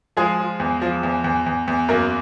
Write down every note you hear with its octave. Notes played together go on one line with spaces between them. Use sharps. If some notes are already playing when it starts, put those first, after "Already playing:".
F3 G#3 G#4
F3
E2
F3
E2
E2
E2
E2
F#2 A#3 A#4